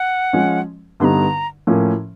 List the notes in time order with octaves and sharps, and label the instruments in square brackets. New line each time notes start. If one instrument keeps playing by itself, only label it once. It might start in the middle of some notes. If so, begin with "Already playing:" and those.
Already playing: [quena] F#5
[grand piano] F3 G#3 C#4
[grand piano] G2 D3 G3 B3 D#4 [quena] A#5 C6
[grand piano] A2 F3 A#3 C#4